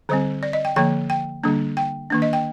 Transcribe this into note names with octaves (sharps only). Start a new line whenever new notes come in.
D3 G3 C4 C5
D5
D#5
G5
D3 F3 A#3 G5
G5
D3 G3 A#3 D4
G5
D#3 A#3 D4
D#5
G5